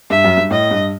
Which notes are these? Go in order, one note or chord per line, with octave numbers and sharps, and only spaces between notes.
G2 E5
F#2
G2
A2 D#5
G2